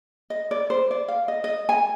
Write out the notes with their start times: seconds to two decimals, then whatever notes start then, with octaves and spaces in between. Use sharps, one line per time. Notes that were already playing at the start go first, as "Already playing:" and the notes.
0.30 D#5
0.51 D5
0.70 C5
0.91 D5
1.08 F5
1.28 D#5
1.44 D#5
1.69 G#5